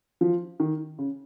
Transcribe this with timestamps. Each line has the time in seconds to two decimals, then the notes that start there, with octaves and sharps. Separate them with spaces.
0.21 F3
0.60 D#3
0.99 C#3